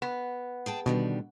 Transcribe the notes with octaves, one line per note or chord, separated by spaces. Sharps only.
B3
G#4 G5 A5
B2 D3 D#3 G3